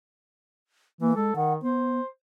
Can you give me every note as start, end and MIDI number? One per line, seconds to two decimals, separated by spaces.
1.01 1.13 52
1.01 1.15 58
1.16 1.32 56
1.16 1.31 69
1.36 1.57 51
1.36 1.53 78
1.62 1.99 59
1.62 2.06 72